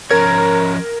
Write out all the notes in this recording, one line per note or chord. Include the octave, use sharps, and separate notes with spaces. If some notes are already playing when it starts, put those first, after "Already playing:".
F3 C#4 A#4 C#5 A#5 G#6